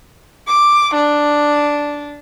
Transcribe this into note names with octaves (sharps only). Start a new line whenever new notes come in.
D6
D4